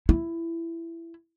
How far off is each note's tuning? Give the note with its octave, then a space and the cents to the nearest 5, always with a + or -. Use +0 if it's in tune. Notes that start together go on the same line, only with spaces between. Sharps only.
E4 +15